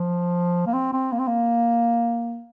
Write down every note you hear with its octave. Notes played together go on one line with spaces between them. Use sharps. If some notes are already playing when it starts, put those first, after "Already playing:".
Already playing: F3
A#3
C4
C4
A#3
C4
A#3